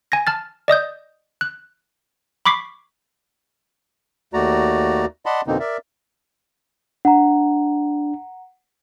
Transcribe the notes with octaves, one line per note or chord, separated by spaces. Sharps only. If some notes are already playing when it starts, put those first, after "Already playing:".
G#5 G#6 A#6
A5 F6 A6
D5 D#5 D#6 G6
F#6
B5 C#6 D6 B6 C7
D#2 A3 F#4 D5 A#5
D5 D#5 F#5 A5 B5 C6
F2 B2 D3 A#3 C4 D#4
A#4 D5 E5
D4 F#5 A#5